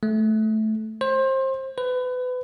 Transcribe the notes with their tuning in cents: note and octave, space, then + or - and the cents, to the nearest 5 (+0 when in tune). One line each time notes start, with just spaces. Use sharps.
A3 -15
C5 +25
B4 +30